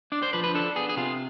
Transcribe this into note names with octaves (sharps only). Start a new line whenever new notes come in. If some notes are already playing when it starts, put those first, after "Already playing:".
D4 D5
C5
F3 B4
B4
D4 A4
B3 G#4
G#4
C3 F4